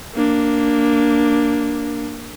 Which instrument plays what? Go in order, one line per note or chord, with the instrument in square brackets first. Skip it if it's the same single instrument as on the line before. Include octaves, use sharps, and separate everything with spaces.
[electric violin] A#3 D4